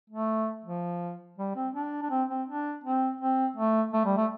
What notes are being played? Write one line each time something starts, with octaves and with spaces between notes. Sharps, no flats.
A3
F3
G3
C4
D4
D4
C4
C4
D4
C4
C4
A3
A3
G3
A3